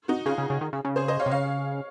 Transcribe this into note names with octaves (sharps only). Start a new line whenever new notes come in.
D#4 F#4
C#3 F4 G#4
C#3
C#3
D#3
C#3
C#3
G#4 C5
C5 D#5
C#5 F5
C3
C#3 C#5 F5